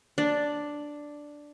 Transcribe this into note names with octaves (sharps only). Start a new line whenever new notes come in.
D4